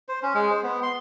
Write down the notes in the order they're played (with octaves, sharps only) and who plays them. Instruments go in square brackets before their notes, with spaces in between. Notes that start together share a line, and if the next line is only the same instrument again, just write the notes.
[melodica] C5
C#4
G#3
C5
B3
C6